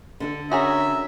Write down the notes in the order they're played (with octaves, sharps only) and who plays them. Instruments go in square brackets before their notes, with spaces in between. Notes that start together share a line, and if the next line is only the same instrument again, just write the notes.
[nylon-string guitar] D3 D4 A4
[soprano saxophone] C#4 [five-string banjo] F#4 G#4 A#4 [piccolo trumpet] E5